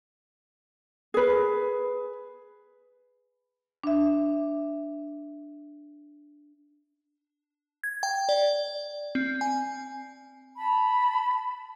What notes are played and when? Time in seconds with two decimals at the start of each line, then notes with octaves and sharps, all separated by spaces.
1.14 G#4 B4
3.84 D4 E5
7.84 G#6
8.03 G5
8.29 D5
9.15 C4
9.41 G#5
10.57 A5 B5